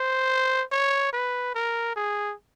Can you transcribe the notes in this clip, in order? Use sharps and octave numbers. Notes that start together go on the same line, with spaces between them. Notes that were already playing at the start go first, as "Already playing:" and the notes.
Already playing: C5
C#5
B4
A#4
G#4